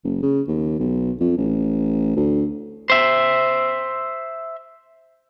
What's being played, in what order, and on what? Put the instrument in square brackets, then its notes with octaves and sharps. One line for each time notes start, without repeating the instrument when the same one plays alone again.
[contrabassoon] F#1
C#3
D#2
B1
F2
A1
D2
[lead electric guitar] C5 E5